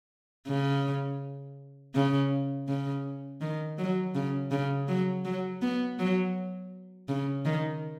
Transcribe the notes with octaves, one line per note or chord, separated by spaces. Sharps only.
C#3
C#3
C#3
D#3
F#3
C#3
C#3
F#3
F#3
B3
F#3
C#3
D#3